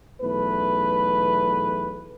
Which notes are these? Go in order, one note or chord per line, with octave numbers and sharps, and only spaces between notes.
B1 E2 A3 B4